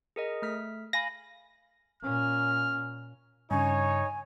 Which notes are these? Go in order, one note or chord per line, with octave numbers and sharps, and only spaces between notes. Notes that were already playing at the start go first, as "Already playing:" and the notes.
G#4 A#4 D#5
A3 F6 B6
F5 G#5 B5 A#6
A#2 C#4 F6
G2 C#3 D#4 C#5 G#5